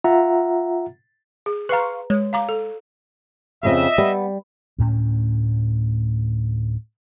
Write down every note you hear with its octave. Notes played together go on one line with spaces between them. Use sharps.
F4 E5 F#5 A#5
G#4
B4 F5 A#5 C6 C#6
G#3 C#5
F5 A#5 D6
A4
F2 C#3 C4 D#5 E5
G3 B3
D2 A2 C4 C#4